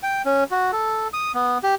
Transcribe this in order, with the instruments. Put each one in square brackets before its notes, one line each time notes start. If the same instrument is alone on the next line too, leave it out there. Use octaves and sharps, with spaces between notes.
[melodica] G5
C#4
F#4
A4
D#6
B3
G4